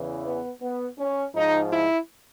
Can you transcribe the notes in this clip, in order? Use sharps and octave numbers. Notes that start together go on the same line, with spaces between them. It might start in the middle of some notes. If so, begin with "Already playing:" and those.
Already playing: E2 C#3 E3
B3
B3
C#4
G#2 F3 D#4
E4